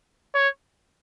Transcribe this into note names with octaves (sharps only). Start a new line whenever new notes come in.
C#5